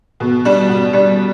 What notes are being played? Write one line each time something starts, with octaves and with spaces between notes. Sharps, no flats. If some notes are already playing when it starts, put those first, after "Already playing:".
B2
G3 D4
B2
G3 D4